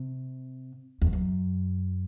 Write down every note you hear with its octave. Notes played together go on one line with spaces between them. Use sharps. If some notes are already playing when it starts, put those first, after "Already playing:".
Already playing: C3
E2
F#2